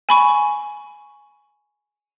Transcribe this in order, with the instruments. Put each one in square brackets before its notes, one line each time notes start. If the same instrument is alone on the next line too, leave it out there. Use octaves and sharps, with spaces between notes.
[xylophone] G#5 B5 C#6